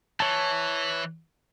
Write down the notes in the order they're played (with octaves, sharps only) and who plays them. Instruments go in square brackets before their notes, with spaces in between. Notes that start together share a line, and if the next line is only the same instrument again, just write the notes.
[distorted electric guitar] E3 [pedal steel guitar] C#5 A5